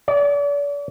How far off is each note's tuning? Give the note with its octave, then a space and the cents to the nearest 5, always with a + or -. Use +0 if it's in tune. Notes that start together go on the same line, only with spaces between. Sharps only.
D5 -40